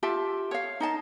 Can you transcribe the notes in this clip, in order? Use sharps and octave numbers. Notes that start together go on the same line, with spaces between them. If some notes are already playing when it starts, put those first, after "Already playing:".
F4 G4 E5 A5
C#5 F5
D#4 D#5 A5